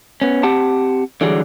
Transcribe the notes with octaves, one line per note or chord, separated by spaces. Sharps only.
B3 C#4
C4 G4 F#5 A5
D3 E3 F#3 G3 G#4